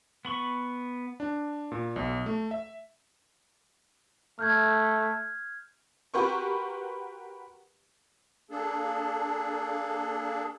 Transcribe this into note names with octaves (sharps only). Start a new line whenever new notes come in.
B3 B5 C#6
D4
A#2
B1
A3
E5
A3 F6 G6 G#6
F#4 G4 A#4 B4 C6 C#6
A#3 D4 G#4 A4